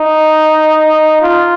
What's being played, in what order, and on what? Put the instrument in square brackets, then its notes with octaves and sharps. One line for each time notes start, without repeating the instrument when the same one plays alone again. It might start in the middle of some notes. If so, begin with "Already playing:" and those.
Already playing: [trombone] D#4
F4